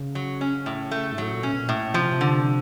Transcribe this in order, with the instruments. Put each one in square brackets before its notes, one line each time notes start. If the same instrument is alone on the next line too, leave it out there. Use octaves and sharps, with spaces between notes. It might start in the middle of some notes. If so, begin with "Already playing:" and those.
Already playing: [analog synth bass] C#3
[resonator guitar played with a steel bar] F#3
C#4
A2
A3
[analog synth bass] G#2
[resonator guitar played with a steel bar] F#3
[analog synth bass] A2
A#2
[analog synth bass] B2 [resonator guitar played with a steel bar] C#4
[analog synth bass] B2
A#2
[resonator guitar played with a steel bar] A2
[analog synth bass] C3 [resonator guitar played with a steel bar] F3
[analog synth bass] C3
[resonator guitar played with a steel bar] D3
[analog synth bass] C3